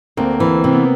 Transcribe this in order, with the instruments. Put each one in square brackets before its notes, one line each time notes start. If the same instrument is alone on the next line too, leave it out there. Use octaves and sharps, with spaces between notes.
[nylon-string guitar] D2 [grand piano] A#3 C4
[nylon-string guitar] E3
[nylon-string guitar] C3 [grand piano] C4
[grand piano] B3